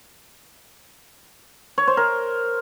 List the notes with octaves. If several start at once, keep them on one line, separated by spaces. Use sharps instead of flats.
C#5
C5
A#4